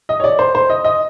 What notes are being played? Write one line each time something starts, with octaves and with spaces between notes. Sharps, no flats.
D#5
C#5
D5
C5
C5
D#5
D#5